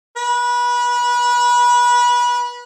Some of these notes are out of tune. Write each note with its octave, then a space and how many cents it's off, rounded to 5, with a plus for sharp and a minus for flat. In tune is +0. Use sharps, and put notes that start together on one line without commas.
B4 -25